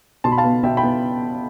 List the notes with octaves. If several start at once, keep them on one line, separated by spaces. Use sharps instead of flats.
B2 A5 C6
B5
F5 A5
B3
B2 E5 G5
G5 B5
B3